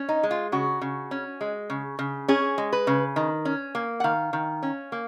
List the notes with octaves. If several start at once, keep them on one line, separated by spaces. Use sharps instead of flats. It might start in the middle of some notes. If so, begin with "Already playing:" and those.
Already playing: C#4
D#4
G#3
F4
C#3 F#4
C#3
C#4
G#3
C#3
C#3
C#4 G#4
G#3
B4
C#3
D#3
C#4
A#3
F#5
D#3 F5
D#3
C#4
A#3